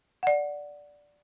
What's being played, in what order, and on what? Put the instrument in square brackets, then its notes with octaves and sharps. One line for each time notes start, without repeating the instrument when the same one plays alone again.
[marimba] D5 F#5